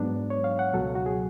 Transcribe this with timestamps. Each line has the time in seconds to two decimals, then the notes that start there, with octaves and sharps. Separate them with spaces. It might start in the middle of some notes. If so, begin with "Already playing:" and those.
Already playing: G#2 F#3 B3 D4
0.30 C#5
0.44 F5
0.59 F#5
0.73 C#2 B2 F#3 A4
0.95 F#4
1.06 G#4